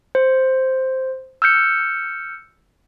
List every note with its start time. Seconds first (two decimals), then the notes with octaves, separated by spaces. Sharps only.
0.15 C5
1.42 E6 F6 G6 C#7